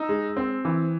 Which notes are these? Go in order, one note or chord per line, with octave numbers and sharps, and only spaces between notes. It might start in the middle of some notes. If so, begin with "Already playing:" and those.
Already playing: D#4 E6
G#3
C4
E3